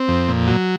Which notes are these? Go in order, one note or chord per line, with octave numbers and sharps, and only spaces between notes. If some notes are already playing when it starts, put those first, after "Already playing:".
Already playing: C4
F2
A#2
F#3